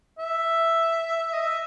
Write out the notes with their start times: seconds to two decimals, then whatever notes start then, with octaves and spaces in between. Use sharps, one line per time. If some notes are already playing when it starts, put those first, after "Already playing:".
0.19 E5
1.33 D#5
1.40 E5